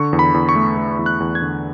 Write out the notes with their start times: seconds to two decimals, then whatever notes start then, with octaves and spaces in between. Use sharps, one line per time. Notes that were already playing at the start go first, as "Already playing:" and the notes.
Already playing: D3 C#6
0.13 E2
0.19 B5
0.34 E2
0.49 C#6
0.55 A3
0.77 A3
0.99 E2
1.06 F#6
1.20 E2
1.35 G#6
1.42 D3